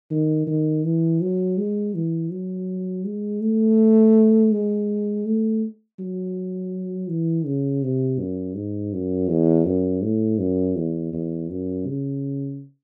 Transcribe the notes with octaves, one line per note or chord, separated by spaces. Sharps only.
D#3
D#3
E3
F#3
G#3
E3
F#3
G#3
A3
G#3
A3
F#3
E3
C#3
C3
F#2
G#2
F#2
E2
F#2
A2
F#2
E2
E2
F#2
C#3